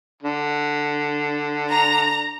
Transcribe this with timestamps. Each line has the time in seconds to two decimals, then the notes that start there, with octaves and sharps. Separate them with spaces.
0.23 D3
1.71 A#5